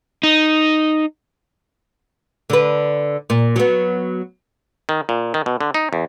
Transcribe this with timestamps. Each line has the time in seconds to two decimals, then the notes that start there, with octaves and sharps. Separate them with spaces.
0.23 D#4
2.50 D3 B4
3.30 A#2
3.56 F#3 B3
4.89 D#3
5.09 A#2
5.34 D#3
5.46 B2
5.61 D3
5.74 D#4
5.93 E2